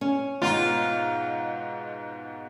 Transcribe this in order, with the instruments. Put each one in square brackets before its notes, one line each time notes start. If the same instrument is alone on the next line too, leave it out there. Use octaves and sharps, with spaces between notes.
[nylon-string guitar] C#4
[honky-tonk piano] G#2 B2 [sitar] F4